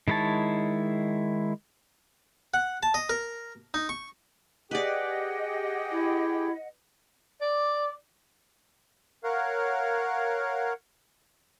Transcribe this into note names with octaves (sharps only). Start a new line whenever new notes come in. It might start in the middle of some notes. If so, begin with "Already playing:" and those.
D#3 G#3 E4 C#5 A5
F#5
A5
D#5
A#4
D#4
C#6
G4 G#4 B4 D5 D#5 F#5 G5
E4
D5
A#4 C#5 F5 F#5